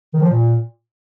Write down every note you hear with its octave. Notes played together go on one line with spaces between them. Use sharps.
D#3
F3
A#2